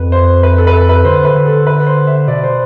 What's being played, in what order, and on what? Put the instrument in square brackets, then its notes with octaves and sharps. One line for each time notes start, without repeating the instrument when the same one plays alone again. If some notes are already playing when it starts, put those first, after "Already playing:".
Already playing: [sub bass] F2 [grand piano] B4
[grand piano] C5
B4
A4
B4
A4
B4
[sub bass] D3 [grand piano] C5
[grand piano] B4
[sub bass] D3
[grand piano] A4
B4
C5
E5
[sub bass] B2 [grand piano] D5
[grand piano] C5